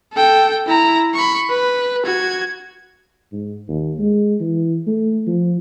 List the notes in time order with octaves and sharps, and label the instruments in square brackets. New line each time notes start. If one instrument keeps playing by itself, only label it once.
[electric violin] A4 G5
E4 A#5
B5 C#6
B4
F#4 G#6
[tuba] G#2
D#2
G#3
E3
A3
F3